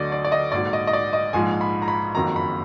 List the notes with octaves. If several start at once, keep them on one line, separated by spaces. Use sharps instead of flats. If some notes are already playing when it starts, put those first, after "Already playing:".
Already playing: D2 D3 F#3 D5 D#5
D5
D5
D#5
A#1 G#2 F#3 D5
D#5
D#5
D5
D#5
A#1 G#2 F3 G#3 G#5
B5
A#5
B5
F#1 F2 D#3 F#3 A#5
B5